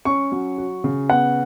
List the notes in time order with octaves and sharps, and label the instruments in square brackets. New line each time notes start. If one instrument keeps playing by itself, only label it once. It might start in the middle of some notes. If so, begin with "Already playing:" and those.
[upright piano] C#4 [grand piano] C#6
[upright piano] F#3
F#4
C#3
[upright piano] B3 [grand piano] F#5